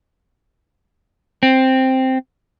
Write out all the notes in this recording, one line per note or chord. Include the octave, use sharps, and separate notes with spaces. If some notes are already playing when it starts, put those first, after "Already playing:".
C4